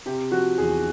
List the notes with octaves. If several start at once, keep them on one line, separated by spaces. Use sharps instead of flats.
C3 G4
F3 F#4
E2 G#4